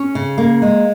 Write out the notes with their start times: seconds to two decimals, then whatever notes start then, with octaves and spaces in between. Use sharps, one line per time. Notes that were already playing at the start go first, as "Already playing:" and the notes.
Already playing: C#4
0.15 C#3
0.38 A#3
0.62 G#3